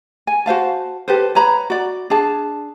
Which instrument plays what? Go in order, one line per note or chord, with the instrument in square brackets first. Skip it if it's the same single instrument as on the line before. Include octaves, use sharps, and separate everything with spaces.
[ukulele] G#5
F#4 C5 F5 A5
G4 A4 B4 C5
B4 C#5 A#5 B5
F#4 D5
D4 G#4 A5